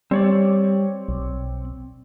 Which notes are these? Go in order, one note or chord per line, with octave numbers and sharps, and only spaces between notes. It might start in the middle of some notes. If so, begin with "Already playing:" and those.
G3 C4 C#5 D5
B1